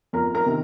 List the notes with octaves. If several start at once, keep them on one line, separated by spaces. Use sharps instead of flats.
F2 A#4 A#5
A#4 A#5
C3 D#3